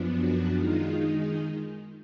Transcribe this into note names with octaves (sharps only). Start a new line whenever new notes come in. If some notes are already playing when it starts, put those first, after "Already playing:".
Already playing: F#2 F3 B3 D4
F#4
D#3 G#3 D#4 F4